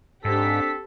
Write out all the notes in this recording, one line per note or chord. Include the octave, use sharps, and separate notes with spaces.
G#2 C4 D4 G4 A4 B6